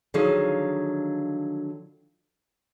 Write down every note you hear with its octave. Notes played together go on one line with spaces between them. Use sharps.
D3 D#3 F3 F#3 G#4 F5